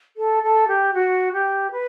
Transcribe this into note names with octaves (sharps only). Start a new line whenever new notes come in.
A4
A4
G4
F#4
G4
B4